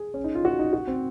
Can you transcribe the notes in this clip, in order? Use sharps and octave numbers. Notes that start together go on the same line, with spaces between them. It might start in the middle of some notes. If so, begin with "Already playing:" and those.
Already playing: G#4
C#4
D#4
F4
F#4
D#4
F#4
C4